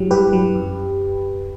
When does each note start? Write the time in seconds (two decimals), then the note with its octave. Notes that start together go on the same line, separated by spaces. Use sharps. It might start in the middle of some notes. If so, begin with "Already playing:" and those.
Already playing: G2 F#3 E4 G4
0.11 G2 G4 B4
0.33 F#3
0.55 F#2